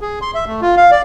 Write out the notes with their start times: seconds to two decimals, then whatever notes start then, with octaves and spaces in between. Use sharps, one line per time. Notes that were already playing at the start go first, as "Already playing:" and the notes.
0.01 G#4
0.22 C6
0.35 E5
0.47 A3
0.62 F4
0.77 F5
0.91 D5